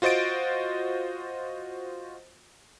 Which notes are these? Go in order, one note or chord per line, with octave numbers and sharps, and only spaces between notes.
F4 F#4 C5 D#5 A6 D7